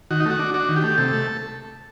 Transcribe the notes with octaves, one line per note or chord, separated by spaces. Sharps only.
D#3 F#4
D#4
A3 F#4
D4
D4 F#4
D#3
G4
A3
C3 A4
A3